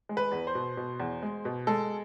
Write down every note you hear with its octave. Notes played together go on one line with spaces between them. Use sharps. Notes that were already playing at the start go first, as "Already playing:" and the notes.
G#3
B4
E2
C5
B2
B2
E2
G#3
B2
G#3 A4